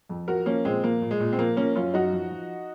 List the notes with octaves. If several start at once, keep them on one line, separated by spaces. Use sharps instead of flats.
F2
F3 F#4 A#4
F3 A#3 C#4
A#2 G#3 C4
F3 A#3
A#2
G#3
A#2
C4
F3 A#3
F3 A#3 C#4
F#2 C#4 F4
F#2 D#4 F#4
F3
F3